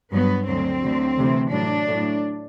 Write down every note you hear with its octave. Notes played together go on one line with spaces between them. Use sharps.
G2 F#3 B3
D2 D3 F#3 C4
D2 D3 F#3
D2 C3 E3
A2 F#3 D4
A2 F#3